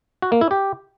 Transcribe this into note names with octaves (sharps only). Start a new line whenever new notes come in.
F#4
A#3
E4
G4